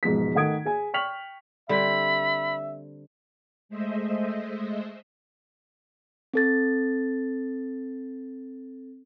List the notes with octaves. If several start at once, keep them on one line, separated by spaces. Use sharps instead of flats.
E1 G#2 F3 B3 B6
D#3 A3 F#5 D#6 G#6 D7
G#4 G#5
G5 C#6 F6 B6 F7 F#7
D3 G3 C4 E5 B5
G#3 A3 C5 D#5 E5
C4 A4 A6